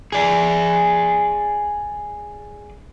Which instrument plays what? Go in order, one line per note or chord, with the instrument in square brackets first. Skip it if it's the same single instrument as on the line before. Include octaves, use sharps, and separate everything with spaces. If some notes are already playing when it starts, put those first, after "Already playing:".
[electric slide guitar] G#4 D5